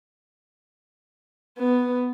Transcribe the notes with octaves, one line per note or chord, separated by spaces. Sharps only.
B3